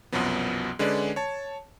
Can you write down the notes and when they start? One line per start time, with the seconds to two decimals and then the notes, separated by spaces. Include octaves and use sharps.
0.12 C2 F#2 B2 F3 F#3 B3
0.79 D3 G#3 C#4 B4 D5
1.16 C#5 A5